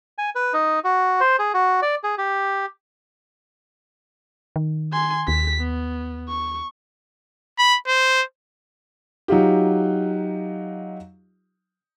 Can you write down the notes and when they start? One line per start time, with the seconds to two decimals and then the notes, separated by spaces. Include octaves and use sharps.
0.18 G#5
0.35 B4
0.53 D#4
0.84 F#4
1.20 C5
1.39 G#4
1.54 F#4
1.82 D5
2.04 G#4
2.18 G4
4.56 D#3
4.93 G#5 C6
5.28 D#2 B6
5.59 B3
6.29 C#6
7.58 B5
7.88 C5
9.28 F#3 D#4 F4 G4